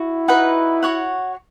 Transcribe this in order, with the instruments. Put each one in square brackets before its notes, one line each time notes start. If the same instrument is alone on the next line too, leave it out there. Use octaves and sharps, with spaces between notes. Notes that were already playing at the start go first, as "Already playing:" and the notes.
Already playing: [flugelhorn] E4 [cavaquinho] F#4
[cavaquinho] D#4 F#4 B4 F#5
F#4 C#5 F#5